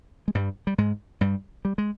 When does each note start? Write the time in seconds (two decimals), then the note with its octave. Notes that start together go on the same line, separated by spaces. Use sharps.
0.28 G#3
0.35 G2 G3
0.67 G3
0.78 G#2 G#3
1.21 G2 G3
1.65 G3
1.78 G#3